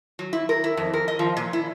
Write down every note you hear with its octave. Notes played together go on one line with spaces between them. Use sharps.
F#3
E4
A#4
E4
F2
A#4
D#5
F3
A#2
E4